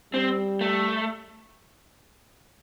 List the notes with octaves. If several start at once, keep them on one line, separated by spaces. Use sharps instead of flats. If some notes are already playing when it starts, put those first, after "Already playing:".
G3 C4
A3